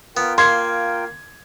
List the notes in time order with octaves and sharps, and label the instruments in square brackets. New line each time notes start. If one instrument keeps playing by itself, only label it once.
[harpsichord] B3 [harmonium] F4 A#4 G5
[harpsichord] A#3 [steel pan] C6 [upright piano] G#6